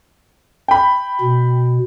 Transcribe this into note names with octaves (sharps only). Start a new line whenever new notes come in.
G5 B5
B2